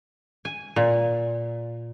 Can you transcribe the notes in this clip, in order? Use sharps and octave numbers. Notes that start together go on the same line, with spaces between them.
G#5
A#2